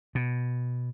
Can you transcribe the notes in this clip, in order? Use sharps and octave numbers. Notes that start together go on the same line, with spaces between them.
B2